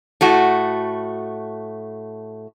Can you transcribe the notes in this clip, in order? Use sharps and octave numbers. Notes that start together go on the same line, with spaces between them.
A2 A3 F#4